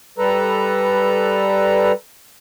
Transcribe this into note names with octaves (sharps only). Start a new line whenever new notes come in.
G3 A4 B4 A#5